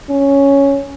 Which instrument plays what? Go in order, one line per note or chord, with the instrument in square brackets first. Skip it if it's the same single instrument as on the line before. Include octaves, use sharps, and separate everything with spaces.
[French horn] C#4